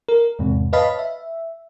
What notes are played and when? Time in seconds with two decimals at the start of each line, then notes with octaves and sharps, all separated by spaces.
0.08 A#4
0.39 E2 G#2 C3
0.73 B4 C#5 D#5 F5 A5 B5
0.99 E5